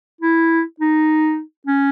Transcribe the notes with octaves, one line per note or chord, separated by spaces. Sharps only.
E4
D#4
C#4